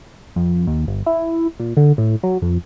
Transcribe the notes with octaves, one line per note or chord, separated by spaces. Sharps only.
F2
D#2
G1
E4
A#2
D3
A2
F#3
F2